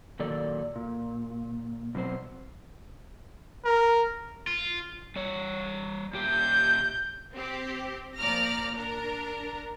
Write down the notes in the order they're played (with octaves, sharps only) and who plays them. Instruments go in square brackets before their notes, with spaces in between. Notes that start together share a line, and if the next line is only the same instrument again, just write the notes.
[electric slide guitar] A#2 D#3 F#3 A4 D5
A#2
B2 F#3 C4 C5
[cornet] A#4
[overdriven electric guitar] F4
[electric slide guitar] G3 C#5
[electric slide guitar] A#2 G4 [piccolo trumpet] G6
[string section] C4 G4
A#2 F3 D5 A#5 F6 A#6
D4 A#4